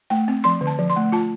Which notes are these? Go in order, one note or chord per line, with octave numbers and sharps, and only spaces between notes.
A3 G5
C4
F3 C6
D3
A5
F3
C6
A3
F4 A5